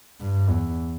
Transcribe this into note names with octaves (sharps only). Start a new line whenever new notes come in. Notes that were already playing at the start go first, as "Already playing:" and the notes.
G2
E2